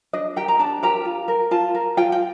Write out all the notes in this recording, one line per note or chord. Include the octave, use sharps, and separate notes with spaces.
D4 D#5
G4 A#4 G5
A#5
D4 A5
G4 A#4 A#5
F4
A#4
F4 A5
A#4
F4 G5
G5